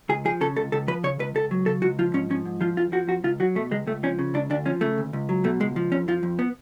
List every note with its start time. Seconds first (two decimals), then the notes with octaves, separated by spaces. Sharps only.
0.09 C#2 G#4
0.25 F3 G#4
0.41 C#3 A4
0.56 C#2 A4
0.72 C#2 A4
0.88 F3 B4
1.04 C#3 C#5
1.19 C#2 B4
1.35 C#2 A4
1.51 F#3
1.66 C#3 A4
1.82 C#2 F#4
1.99 F3 F4
2.14 G#2 C#4
2.30 F3 C#4
2.45 G#2
2.61 F3 F4
2.76 F2 F4
2.92 F3 F#4
3.08 F2 F#4
3.24 C#2 F4
3.40 F#3 F#4
3.55 B2 A3
3.71 C#2 G#3
3.87 C#2 A3
4.03 F3 C#4
4.19 C#3
4.34 C#2 D4
4.50 D2 D4
4.65 F3 C#4
4.81 C#3 A3
4.98 D2
5.13 C#2
5.29 F#3
5.44 B2 A3
5.60 C#2 G#3
5.76 F3
5.92 F2 C#4
6.08 F3 F4
6.23 F2
6.39 B3